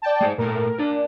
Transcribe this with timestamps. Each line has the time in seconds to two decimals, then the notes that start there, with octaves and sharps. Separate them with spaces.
0.02 D5 G5 A5
0.21 G#3 G#4 C5
0.38 A#2 A3 A4 A#4
0.79 D4 A#4 D5